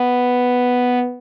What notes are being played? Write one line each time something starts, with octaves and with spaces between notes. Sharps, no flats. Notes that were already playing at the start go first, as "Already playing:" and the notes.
Already playing: B3